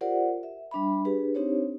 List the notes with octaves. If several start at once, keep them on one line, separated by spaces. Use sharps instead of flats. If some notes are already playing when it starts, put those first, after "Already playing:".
F4 G4 A#4 C5 D5 F#5
E5
G3 D4 E5 B5
D4 G4 G#4 B4
C4 D4 D#4 G4 C5 C#5